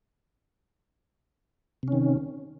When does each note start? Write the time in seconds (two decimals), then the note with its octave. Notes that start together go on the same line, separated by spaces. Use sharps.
1.83 C3
1.88 C#4
1.92 D#3